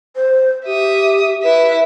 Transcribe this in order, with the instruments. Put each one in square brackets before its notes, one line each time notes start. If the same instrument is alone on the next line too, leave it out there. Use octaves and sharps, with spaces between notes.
[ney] C5
[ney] G4 [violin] E5 D#6
[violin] E4 E5 [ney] B4